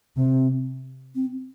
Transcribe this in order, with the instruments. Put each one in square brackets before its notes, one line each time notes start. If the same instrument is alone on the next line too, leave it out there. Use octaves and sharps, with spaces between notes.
[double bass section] C3 [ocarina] C4
[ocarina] C4